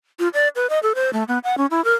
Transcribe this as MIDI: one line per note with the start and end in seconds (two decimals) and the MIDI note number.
0.19 0.28 65
0.34 0.48 74
0.56 0.67 71
0.70 0.79 75
0.83 0.93 69
0.95 1.10 72
1.13 1.23 57
1.28 1.39 59
1.44 1.56 78
1.58 1.66 61
1.71 1.84 64
1.85 1.93 70